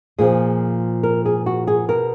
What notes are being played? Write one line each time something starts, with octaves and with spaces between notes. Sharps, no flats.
A#2 F3 G#4
A#4
G#4
F#4
G#4
B2 A#4